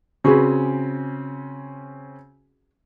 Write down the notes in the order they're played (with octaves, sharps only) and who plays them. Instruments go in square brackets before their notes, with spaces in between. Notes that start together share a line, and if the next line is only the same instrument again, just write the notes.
[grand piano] C#3 C4 C#4 [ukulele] F#4 G#4 B4